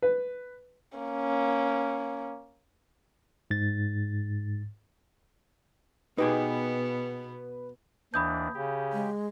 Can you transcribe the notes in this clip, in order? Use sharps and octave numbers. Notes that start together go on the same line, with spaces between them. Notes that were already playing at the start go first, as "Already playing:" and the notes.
B4
A#3 C#4
G#2 A6
B2 B3 D#4 G4 G#4 B4
D#2 E3 D4 B5 D#6 G6
C#3 G4
G#3